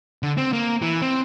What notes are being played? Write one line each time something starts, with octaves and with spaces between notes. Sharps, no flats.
D3
C4
A#3
E3
C4